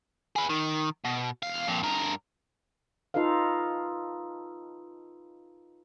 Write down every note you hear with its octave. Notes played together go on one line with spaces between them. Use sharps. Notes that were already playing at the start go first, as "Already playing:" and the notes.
G#4 B4
D#3
B2
E2 F5
F2 A#2
G2 A#4
D#4 F4 A4 B4 F5